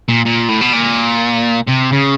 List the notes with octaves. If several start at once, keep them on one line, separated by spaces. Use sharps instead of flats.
A#2
A#2
A2
B2
A#2
C3
C#3